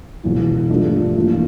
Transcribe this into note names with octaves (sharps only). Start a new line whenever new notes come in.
E1 E2 E3
G2 F3 A3 D4
F2 E3 A#3 D4 F4